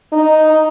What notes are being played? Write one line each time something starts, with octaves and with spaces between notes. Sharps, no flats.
D#4